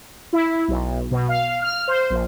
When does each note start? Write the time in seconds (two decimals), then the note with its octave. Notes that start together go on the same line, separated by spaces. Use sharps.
0.33 E4
0.68 B1
1.11 B2
1.29 F5
1.62 F6
1.88 C5
2.10 A#1